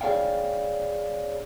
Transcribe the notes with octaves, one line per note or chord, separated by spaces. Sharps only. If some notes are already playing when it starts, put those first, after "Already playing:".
G#4 C#5 D5 F5 G5